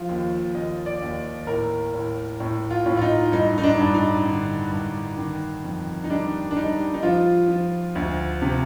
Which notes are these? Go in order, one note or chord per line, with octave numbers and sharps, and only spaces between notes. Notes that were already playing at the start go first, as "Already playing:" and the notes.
Already playing: F3 F4
D#2
D#2 D#5
D5
D#2
A2 A#4
A2
A2
F4
A2
F4
D#4
G2 D#4
D#4
D4
G2
D#4
D3
G2
D#3
F2
D#4
G3 D4
D4
G3 D#4
D#4
F3 F4
F3
D2
C3